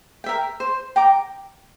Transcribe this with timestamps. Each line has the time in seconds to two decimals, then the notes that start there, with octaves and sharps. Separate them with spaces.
0.24 A#4 E5 G5
0.60 C5
0.96 G5 A#5 D6